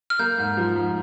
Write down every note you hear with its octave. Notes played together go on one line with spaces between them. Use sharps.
F6
A#3 G6
G#2
F3
G#2